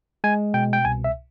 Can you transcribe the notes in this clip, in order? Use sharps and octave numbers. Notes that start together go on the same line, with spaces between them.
G#3 G#5
B2 G5
G5
C2 G#5
E5